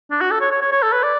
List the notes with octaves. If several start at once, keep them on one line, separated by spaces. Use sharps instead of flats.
D4
F#4
A4
C#5
C#5
C#5
C#5
A4
B4
D5